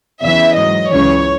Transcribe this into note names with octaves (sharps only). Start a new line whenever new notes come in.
E2 C#3 E3 E5
G#2 F#3 D#5
C#2 C#3 E3 C#5